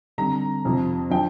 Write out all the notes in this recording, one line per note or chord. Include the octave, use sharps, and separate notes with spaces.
D3 G3 C4 A#5
F2 C3 F3
F3 D4 G5